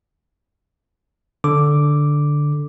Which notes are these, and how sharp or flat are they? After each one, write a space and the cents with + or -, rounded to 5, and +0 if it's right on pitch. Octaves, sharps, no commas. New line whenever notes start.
D3 +0 D6 +0